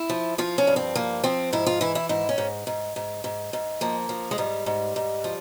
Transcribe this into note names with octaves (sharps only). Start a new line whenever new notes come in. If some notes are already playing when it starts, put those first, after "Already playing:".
Already playing: E4
F3
F3 F4
C#4
G2
C4
F3 A#3
F3 C4
G#2 E4
F4
E3 E4
E4
G#2 E4
C#4
G#2
G#2
G#2
G#2
G#2
F3 A#3
F3
G#3
G#2 G3
G#2
G#2
F3